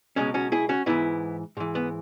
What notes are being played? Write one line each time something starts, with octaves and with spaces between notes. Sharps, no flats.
C#2 B2 F#3 G#3 C#4
C#4 F#4
E4 G#4
C#4 F#4
G#2 E3 B3 E4
G#2 E3
B3